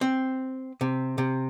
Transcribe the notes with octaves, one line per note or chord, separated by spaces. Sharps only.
C4
C3
C3